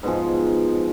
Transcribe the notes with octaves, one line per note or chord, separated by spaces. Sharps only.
G#2 B2 F3 G#4